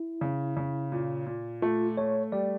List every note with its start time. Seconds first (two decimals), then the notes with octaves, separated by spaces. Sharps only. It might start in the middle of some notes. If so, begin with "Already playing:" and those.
Already playing: E4
0.21 C#3
0.57 C#3
0.92 A#2
1.27 A#2
1.62 A3 F4
1.97 A3 C#5
2.32 G3 D5